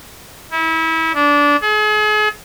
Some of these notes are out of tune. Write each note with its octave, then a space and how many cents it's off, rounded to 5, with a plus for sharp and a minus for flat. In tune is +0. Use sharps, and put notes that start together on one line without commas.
E4 -30
D4 -20
G#4 +40